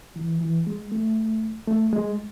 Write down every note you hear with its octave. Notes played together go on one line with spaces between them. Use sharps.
E3
E3
G#3
A3
A3
G#3